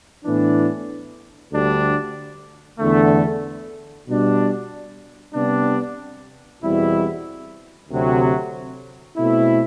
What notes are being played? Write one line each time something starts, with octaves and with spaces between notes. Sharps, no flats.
A2 E3 B3 D4
D2 D3 G3 D4
E2 D3 A3
B2 G3 D4
C3 G3 B3 D4
E2 B2 G3 C4 E4
D2 C3 F#3
B2 A3 C4 E4